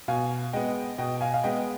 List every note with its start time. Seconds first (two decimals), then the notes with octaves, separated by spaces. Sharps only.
0.08 B2 F5 G#5
0.53 G#3 B3 D#5 G5
0.98 B2 D#5 G5
1.21 F5 G#5
1.34 F5
1.44 G#3 B3 D#5 G5